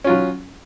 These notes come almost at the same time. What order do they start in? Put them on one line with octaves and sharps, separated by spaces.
C#4 F4 F#3